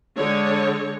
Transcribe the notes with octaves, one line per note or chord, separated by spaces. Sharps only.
D3 G#3 C#5